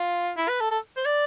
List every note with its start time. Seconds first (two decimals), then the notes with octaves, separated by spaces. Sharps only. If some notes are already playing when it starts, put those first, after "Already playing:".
Already playing: F4
0.37 E4
0.48 B4
0.60 A4
0.71 A4
0.97 C5
1.05 D5